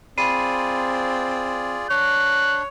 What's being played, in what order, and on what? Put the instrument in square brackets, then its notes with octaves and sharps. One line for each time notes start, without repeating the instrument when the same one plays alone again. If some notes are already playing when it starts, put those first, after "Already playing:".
[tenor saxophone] C4 [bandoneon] F4 G#4 D5 [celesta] B5 C7 D#7
[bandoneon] D4 [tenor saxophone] C#5 [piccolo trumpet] F#6